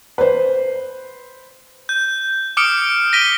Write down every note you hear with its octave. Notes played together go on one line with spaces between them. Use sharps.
B4 C5
G6
D6 D#6 F6 C#7 D7
A#6 B6 D7 D#7 G7